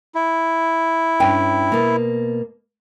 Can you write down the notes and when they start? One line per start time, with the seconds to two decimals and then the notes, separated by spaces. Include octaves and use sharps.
0.15 E4
1.20 G2 C#4 G5
1.72 B2 A#3